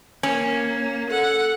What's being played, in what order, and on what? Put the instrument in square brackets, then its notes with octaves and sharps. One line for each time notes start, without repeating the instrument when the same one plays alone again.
[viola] A#3 [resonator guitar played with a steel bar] C#4 [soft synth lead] C#5
[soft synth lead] A4 [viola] F#5